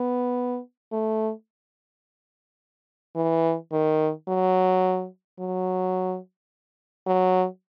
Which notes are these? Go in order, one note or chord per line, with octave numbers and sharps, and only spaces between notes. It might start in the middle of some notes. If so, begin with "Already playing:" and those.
Already playing: B3
A3
E3
D#3
F#3
F#3
F#3